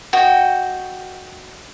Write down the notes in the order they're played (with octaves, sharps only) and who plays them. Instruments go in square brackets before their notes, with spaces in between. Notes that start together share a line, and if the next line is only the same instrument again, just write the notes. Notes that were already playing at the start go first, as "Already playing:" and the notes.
[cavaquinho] F#4 D#5 G5